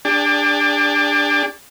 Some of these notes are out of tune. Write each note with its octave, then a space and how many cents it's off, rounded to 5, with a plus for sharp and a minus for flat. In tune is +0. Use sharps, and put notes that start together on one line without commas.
D4 +0 G4 +45